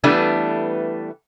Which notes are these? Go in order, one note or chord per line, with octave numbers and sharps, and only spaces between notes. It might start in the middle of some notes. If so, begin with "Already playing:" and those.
E3 G3 A3 B3 D4